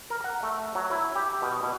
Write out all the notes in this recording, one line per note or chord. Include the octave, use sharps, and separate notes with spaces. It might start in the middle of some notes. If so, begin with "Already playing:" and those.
A#4
F#5
A3
F#3
E4
G4
B2
B2